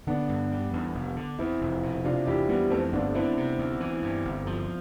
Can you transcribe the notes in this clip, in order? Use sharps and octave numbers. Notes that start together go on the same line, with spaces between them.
D3 B3 D4
G2
G3
E2
F1
D3
E2 C4 E4
F1
B2
C3 D4 F4
E2 E4 G4
E3 G3 B3
F2 A3 C4
G1 B3 D4
D3 C4 E4
C3
D2
E3
G2
G1
F3